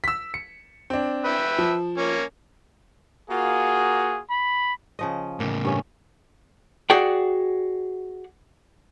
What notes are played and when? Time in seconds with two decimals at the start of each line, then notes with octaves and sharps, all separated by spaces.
0.04 E6 B6
0.34 C#7
0.90 C4 D4
1.25 B4 E5 G5
1.58 F3
1.98 A#3 C#4
3.30 A#3 F4 F#4 G#4
4.30 B5
4.99 C#3 F3 D#5
5.40 A2 C#3 A#3
5.64 G2 C#4
6.90 F#4 G#4 D5 F#5 G5